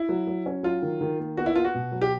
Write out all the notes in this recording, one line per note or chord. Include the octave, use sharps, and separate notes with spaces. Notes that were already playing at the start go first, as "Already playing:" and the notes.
Already playing: E4
F#3
F#3
C#4
F#3 F4
D#3
D#3
A#3
B3 F#4
E4
B3 F4
F#4
B2
F#3
G4